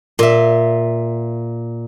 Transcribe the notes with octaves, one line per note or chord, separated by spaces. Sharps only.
A#2 E5